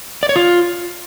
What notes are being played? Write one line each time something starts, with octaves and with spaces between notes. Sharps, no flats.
D5
C#5
F4